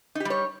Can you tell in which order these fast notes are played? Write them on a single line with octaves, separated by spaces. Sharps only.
D#4 G4 G3 C#5